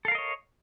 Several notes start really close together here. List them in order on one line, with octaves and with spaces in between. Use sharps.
A4 F5 A#4 D#5 C#5